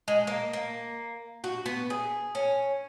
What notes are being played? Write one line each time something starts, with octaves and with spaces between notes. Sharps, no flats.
G#3
A#3
A#3
F#4
B3
G#4
C#4